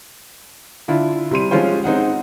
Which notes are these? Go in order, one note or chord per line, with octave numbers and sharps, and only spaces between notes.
D3 E4 F4
C3 G3 C6 D#7
F3 G#3 C#4 F4 C5
C4 D#4 G#4 F#5